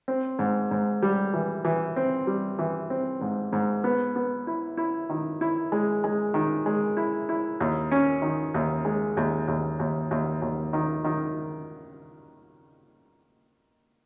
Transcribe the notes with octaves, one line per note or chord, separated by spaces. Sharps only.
C4
G#2
G#2
G3
E3
E3
C4
G3
E3
C4
G#2
G#2
B3
B3
E4
E4
D#3
E4
G#3
G#3
D#3
G#3
E4
E4
D#2
C#4
D#3
D#2
G#3
D#2
D#2
D#2
D#2
D#2
D#3
D#3